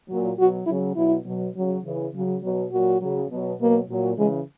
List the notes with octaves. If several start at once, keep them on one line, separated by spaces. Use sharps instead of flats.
A#2 F#3
B2 F#3 F#4
C#3 F#3 E4
B2 F#3 E4
B2 F#3
C#3 F#3
C#3 E3
C#3 F#3
B2 F#3
A#2 F#3 F#4
C#3 F#3
B2 F#3
B2 F#3 A#3
A#2 F#3
C#3 E3 G#3